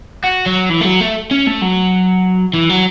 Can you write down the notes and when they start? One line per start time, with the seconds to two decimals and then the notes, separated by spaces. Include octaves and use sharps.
0.24 F#4
0.46 F#3
0.70 E3
0.81 A3
0.85 F#3
1.01 A3
1.31 C#4
1.47 A3
1.62 F#3
2.54 E3
2.70 F#3